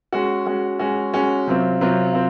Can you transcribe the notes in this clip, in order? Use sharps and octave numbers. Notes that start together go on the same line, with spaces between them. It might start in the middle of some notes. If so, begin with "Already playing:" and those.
G#3 C#4 F#4
G#3 C#4 F#4
G#3 C#4 F#4
G#3 C#4 F#4
C3 F#3 C4 F4
C3 F#3 C4 F4
C4 F4